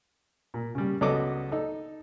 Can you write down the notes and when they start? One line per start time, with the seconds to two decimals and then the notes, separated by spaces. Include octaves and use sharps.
0.54 A#2
0.75 C#3 G3
1.01 C#2 F#3 B3 A4 D#5 D6
1.52 D#4 A4